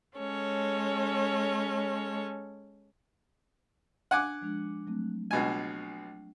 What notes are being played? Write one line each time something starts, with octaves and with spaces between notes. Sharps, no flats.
G#3 C#4 A4 C#5
D4 F#5 G#5 D6
F3 G#3 D4
F#3 A3 C4
C#2 B2 D4 G#5